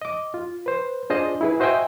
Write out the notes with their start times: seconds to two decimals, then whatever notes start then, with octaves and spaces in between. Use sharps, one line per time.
0.01 D#5 D6
0.34 F4
0.66 B4 C5
1.10 D4 F4 G#4 C5 D5 D#5
1.41 E4 G#4 B4
1.60 F#4 C5 D#5 E5 G5 G#5